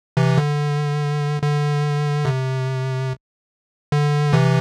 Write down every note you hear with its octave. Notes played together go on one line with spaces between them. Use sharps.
C3 E3
D3
D3
C3
D3
C3 E3